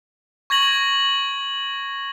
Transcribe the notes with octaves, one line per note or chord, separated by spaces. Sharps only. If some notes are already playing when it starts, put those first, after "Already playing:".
C#6 G#6 A#6 F#7